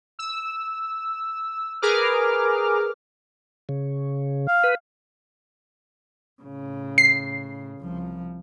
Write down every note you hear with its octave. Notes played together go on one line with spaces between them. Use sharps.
E6
G#4 A#4 B4 D6 F6
C#3
F5
B4
A2 C#3
C7
C2 F3